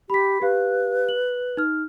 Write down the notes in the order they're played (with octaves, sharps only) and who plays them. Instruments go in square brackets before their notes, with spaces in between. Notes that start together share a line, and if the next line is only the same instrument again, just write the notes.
[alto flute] G4 [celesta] B5 B6
[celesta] G4 F5 [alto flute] B4
[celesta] F#7
D#4 F6